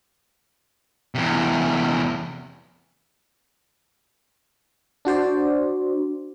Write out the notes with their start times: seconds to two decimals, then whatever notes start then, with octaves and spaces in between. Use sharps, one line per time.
1.15 E2 C3
5.05 D4 F#4 C5 D5